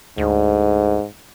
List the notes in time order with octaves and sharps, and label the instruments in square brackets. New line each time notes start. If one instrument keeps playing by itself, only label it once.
[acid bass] D2 [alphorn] G#2